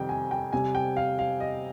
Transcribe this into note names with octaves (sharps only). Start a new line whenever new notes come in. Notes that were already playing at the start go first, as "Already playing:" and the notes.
Already playing: F2 C3 D#3 G3 G5
G#5
G5
C3 G3 G#5
G5
F5
F5
D#5